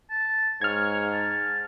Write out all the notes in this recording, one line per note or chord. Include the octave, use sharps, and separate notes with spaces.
A5
G#2 C#5 F6 G#6
A5